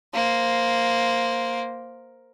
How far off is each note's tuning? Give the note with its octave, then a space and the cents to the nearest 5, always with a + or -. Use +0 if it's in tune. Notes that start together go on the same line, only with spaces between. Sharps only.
A#3 +0 C5 +0